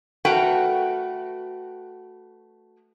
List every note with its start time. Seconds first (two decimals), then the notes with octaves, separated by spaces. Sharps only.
0.25 A3 F#4 A#4 B4 F#5 G5